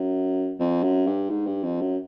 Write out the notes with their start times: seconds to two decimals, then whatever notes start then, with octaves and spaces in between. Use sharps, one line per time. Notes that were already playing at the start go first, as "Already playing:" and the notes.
Already playing: F#2
0.60 F2
0.83 F#2
1.06 G2
1.30 G#2
1.47 G2
1.64 F2
1.81 F#2